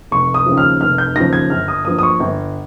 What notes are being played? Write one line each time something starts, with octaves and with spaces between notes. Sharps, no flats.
F1 C#6
D#6
D#2 C#3 F3
F6
F1 F6
G6
D#2 C#3 F3 A#6
G#6
G1 F6
D#6
G2 F3 A#3 D#6
D#6
C#6
G1